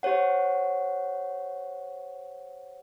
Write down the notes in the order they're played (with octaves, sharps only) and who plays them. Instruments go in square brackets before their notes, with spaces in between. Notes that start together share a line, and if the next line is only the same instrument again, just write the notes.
[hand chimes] G4 C5 C#5 F#5